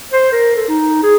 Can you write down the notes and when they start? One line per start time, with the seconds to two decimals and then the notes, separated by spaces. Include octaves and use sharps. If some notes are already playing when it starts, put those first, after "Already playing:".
0.13 C5
0.32 A#4
0.56 A4
0.68 D#4
1.03 G#4